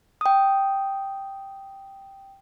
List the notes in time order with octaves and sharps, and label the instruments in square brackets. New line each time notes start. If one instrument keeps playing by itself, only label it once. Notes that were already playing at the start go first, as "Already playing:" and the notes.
[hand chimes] G5 D#6